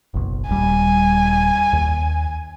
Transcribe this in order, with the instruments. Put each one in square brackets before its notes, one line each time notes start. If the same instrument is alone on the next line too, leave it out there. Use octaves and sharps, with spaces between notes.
[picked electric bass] F#1 B1
[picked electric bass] D#1 G3 [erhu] G#5
[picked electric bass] D#2